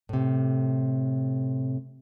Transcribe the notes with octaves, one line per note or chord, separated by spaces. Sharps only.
A2 C3